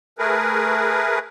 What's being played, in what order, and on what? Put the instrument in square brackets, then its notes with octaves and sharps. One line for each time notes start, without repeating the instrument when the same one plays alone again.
[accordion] A3 G#4 A#4 B4